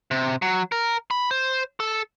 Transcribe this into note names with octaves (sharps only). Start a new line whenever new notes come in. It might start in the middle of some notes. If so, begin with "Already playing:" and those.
C3
F#3
A#4
B5
C5
A4